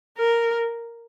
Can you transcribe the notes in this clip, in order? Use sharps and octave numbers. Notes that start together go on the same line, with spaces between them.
A#4